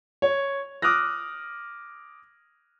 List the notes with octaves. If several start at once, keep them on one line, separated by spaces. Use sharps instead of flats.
C#5
D6 D#6 F6 F#6 A#6